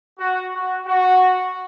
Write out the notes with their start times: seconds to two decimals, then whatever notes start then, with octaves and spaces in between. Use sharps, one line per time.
0.19 F#4
0.53 F#4
0.86 F#4